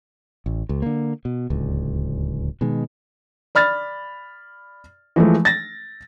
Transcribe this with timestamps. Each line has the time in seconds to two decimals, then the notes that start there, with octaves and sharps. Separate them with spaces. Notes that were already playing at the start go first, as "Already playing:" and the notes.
0.46 A1
0.69 C#2
0.82 D3 A#3
1.25 B2
1.50 D1 C#2
2.61 B2 D#3 G#3
3.55 D5 B5 F6 A6
5.16 E3 F3 G#3 A3
5.45 A6 A#6